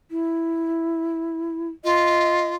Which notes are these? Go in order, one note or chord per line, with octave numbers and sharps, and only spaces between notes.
E4
F4 D#5